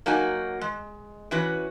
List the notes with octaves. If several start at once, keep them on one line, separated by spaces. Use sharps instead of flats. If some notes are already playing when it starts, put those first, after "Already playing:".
F#3 A#3 D#4 F#4 G#5
G#3
E3 C#4 F#4 B4